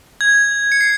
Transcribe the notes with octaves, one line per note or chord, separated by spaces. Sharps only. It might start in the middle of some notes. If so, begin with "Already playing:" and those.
G#6
C#7
C7